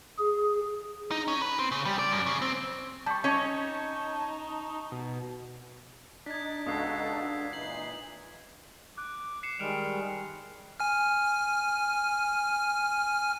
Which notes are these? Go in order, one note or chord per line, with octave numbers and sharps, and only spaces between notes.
G#4
D#4
C#4
B4
C4
C#3
G3
D5
F#2
C#3
C4
G3 A5 C#6
C#4 D#4 C#5
B2
D4 D#4 G#6 B6
C#2 D#4 F#4 A4 D#6 C7
A#2 E3 D#4 C7 F#7
D6 F#6
C7 C#7 E7
D#3 G3 G#3 F6 D7 F7
G#5 F6